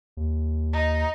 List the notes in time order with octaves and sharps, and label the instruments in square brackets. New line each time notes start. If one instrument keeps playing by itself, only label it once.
[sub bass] D#2
[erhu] D#4